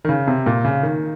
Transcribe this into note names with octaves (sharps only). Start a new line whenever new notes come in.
D#3
C#3
C3
A#2
C#3
D#3